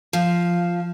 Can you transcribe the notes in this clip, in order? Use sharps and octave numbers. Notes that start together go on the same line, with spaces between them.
F3